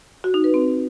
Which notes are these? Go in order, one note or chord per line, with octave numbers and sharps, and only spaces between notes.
F#4
D#4
B4
C4